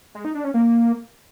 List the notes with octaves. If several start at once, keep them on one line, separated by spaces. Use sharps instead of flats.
G#3
D#4
D4
C#4
A#3